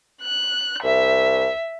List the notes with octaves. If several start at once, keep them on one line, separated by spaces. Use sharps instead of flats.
F#6
C2 E5